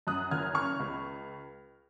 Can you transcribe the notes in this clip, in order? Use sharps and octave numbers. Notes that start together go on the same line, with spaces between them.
F#2 D#6 F#6
F#1 F6 G#6
C#3 C#6 F6
C#2